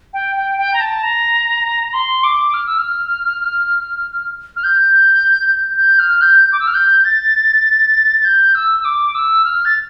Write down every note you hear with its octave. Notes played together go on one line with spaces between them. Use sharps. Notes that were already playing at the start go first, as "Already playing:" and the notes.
G5
G5
G5
A#5
A5
A#5
A#5
C6
D6
F6
E6
F6
F6
G6
G6
G6
F6
G6
D6
E6
F6
G6
A6
A6
G6
E6
E6
D6
E6
F6
A6